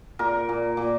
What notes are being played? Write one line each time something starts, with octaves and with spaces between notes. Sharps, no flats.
A#2 A#4
A#2
A#2